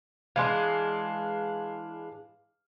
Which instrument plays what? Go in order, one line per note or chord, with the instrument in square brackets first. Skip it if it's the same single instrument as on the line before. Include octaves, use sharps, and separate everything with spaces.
[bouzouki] E3 G#3 D4 [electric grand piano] F5 C6